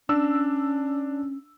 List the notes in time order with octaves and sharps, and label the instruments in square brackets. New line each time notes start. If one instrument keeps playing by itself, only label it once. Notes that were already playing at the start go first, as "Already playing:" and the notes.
[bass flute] C#4 [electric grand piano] D4 E6